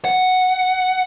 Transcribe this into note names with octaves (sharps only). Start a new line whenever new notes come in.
F#5